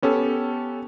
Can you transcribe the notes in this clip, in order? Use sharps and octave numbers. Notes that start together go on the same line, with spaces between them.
B3 C#4 G4 A4